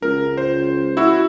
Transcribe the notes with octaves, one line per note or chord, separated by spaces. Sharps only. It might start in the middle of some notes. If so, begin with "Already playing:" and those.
C#2 A#4
C5
E4 F#4 E6